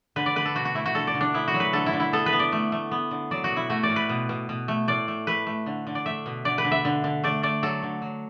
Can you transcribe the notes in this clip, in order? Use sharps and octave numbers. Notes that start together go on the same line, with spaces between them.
D3 B4
D5
D3 B4
A4
B2 F#4
F#4
A3 E4
F#4
D3 A4
D5
D3
D4
B3 E4
F#4
F#3
B4
D3 A4
E4
D3
E4
B3 A4
B4
B3
D5
A3
A3
B3
D3
F#3 D5
F#4
B2
E4
A3 F#4
D5
A2
B4
B2
B2
B2
A3
A2 D5
A3
A3 B4
A3
D3
D3
D5
A3 E5
B2
D3 D5
B4
D3
E5
D3
D3
A3 D5
A3 D5
F#3 A4
D3
F#3